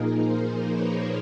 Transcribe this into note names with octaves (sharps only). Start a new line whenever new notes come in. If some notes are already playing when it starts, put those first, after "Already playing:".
Already playing: A#2 F3 A#3 D#4 G#4 A#4
A#4 C5
B4 C#5